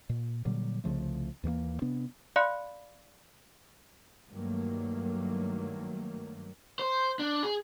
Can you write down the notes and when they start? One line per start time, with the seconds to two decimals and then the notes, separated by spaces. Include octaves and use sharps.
0.09 A#2
0.45 A#2 D3 F#3 G3
0.84 C2 C#3 F3 A3
1.43 D#2 E3 G3 A#3
1.82 C3 B3 D4
2.36 D5 F5 B5 C6 F#6 C#7
4.32 G2 D#3 F#3 A3 A#3
6.79 C5
7.19 D4
7.43 G#4